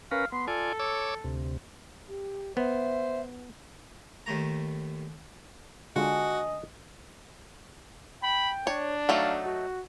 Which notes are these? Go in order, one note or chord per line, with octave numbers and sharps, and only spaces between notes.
C#4 A#4 B4 F5
B3 C6
F4 A4 D5 G#5
C#5 D6 E6
D2 C3
G4
B3 C5 E5
D#2 D#3 A3 A#5
D3 G#3 D4 F4 F#4 D#5 G#5
G5 B5
D4 C#5
F#3 A3 D#4 F5
F#4